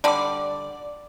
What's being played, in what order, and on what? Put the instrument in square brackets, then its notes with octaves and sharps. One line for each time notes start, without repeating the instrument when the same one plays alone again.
[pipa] D3 G3 [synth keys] D5 D6